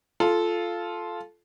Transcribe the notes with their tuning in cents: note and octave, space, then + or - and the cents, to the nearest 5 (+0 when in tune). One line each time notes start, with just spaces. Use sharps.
F4 -5 A4 -15